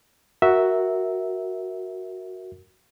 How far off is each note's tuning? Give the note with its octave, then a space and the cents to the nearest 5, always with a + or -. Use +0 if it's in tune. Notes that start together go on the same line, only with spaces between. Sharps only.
F#4 +0 A#4 +0 E5 -10